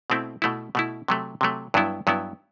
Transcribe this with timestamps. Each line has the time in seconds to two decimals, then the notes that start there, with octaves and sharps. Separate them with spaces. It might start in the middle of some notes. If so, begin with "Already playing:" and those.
0.10 B2 A3 C4 E4
0.42 B2 A3 E4
0.75 B2 A3 E4
1.08 C3 F#3 A3
1.41 C3 F#3 A3
1.74 G2 F#3 B3 E4
2.07 G2 F#3 B3 E4